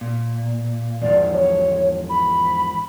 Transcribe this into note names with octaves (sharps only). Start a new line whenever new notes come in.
A#2
E2 G#2 F3 D5
C#5
B5